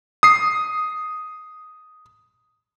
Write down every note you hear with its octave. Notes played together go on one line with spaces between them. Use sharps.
D#6 C7